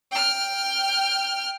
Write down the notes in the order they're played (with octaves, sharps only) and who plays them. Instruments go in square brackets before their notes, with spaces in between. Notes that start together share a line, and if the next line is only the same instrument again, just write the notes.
[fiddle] G5 F6